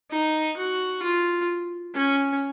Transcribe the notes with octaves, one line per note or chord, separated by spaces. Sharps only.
D#4
F#4
F4
C#4